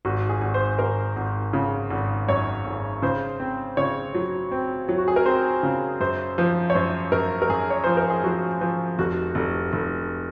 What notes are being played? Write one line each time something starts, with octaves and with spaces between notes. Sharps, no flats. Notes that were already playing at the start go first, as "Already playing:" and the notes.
G#1 F#4
G#4
G#1
C5
G#1 A#4
G#1
C#3
G#1
F#2 C#5
G#1
C#3 C5
C4
C#3 C#5
F#3
C4
F#3
F#4
G#4
A#4
C4 C5
C#3
F#2 C5
F3
C#5
F#2 C5
F#2 A#4
A#4
F#2 G#4
C#5
F3 C5
A#4
G#4
F3 F#4
F3
F1 F#4
F1
F1